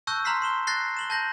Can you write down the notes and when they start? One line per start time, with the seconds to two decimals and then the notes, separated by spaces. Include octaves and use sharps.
0.07 A5 C#6 E6 F#6 G6 A#6
0.25 A#5 C6 F6 B6 C7
0.42 C6 E7 G7
0.67 F#6 A6 A#6 C7 G7
0.97 E7 F#7 G7
1.10 A5 G6 A#6 F#7